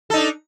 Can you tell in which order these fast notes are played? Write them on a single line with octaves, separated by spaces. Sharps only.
A4 D#4 D4